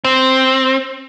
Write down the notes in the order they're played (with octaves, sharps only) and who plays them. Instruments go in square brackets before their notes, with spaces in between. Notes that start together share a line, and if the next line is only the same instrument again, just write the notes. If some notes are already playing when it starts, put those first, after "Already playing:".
[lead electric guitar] C4